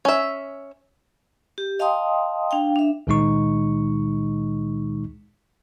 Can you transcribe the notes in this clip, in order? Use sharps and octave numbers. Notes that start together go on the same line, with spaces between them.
C#4 E5
G4
D#5 F5 G5 A5 C6 D#6
D4 F5 G5
D4 E5
C#2 A#2 D#3 G#3 D#4 C#6